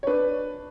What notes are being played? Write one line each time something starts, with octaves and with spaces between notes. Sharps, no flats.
C#5
D4 B4